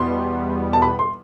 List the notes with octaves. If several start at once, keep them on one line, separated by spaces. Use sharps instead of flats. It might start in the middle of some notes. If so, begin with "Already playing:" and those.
Already playing: E2 B2 G3 B3 C6
A5
B5
C6